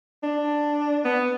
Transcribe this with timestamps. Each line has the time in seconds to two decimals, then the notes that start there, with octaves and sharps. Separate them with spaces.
0.23 D4
1.05 B3